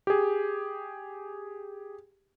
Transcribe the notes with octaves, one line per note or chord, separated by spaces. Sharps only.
G4 G#4